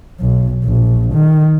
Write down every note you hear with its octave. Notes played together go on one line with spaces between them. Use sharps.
B1
A#1
D#3